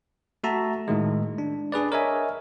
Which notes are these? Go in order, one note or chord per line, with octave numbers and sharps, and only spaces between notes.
A3 F#4 E5 A5 A#5
A2 D#3 G#3
D4
D4 G#4 B4 D5
A#4 C#5 D#5 E5 G#5